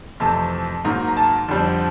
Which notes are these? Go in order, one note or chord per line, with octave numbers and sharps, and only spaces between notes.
F2 C3 E3 A3 C4 A5
G#2 D#3 F#3 A#3 A#5
A#5
A5
F2 D3 G3 C4